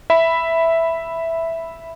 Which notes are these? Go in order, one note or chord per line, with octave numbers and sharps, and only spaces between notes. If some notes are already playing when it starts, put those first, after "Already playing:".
E5 B5